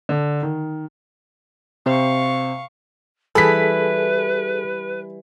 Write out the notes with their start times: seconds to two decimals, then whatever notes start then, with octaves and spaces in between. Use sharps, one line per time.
0.09 D3
0.43 D#3
1.86 C3 C5 F5 C#6
3.35 E3 G3 G#4 A4 B4 B5 B6